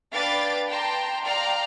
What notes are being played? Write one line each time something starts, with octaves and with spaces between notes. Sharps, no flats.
D4 B4 F5 G5 D6 A6
G5 A5 A#5 C6
D5 F5 G5 A#5